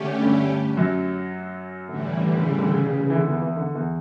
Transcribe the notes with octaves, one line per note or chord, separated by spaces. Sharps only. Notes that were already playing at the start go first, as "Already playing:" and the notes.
Already playing: D3 A3 C#4 G4
G2 G3
F#2 F#3
A2 D3 E3 G3
D3
D3
C#3
D3
C#3
C#3
C#3
E3
D3
E2 E3
E2 E3
D3
E2 E3